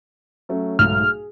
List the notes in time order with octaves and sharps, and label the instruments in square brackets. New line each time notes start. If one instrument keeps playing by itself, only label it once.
[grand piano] F#3 A3 C#4
[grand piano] B1 G#2 A3 [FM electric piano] F6
[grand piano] G#4